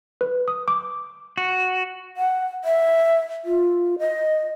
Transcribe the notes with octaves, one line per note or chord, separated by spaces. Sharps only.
B4
D#6
D6
F#4
F#5
E5
F4
D#5